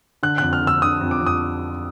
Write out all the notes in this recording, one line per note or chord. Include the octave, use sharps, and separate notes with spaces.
D3 F#6
F2 F#6
F6
D3
E6
D3 D#6
F2
D6
F2
D#6